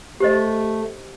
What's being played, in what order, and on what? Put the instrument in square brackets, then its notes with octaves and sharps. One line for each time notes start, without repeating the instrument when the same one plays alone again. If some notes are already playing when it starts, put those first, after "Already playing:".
[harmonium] A3 [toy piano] G4 C5 D#5